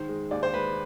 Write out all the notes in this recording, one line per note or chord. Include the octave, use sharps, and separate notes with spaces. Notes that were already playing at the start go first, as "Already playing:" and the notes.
Already playing: G#2 D#3 C5
G#3
D#2 D5
C5
G#3 B4